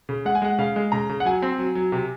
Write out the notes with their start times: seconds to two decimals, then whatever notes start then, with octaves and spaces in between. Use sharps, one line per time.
0.09 C#3
0.25 G#3 F#5
0.35 G#5
0.42 G#3 F#5
0.59 C#3 F5
0.76 G#3
0.92 C#3 A#5
1.09 C#3
1.20 F#5
1.25 F#3 G#5
1.42 C4
1.58 F#3
1.75 F#3
1.92 C3